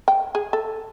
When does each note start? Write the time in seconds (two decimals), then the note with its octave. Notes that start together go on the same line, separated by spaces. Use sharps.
0.08 G5
0.35 G#4
0.53 A4